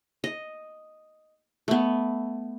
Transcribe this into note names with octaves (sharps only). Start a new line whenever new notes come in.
D#5
A3 B3